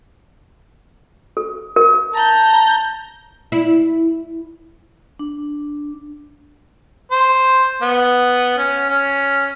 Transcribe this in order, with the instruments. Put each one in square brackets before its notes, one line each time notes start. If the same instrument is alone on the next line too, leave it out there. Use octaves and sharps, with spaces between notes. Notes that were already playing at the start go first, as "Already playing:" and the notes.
[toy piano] A4
A#4
[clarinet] A5 [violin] A#5 G6
[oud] E4
[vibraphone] D4
[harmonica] C5
B3
C#4
C#4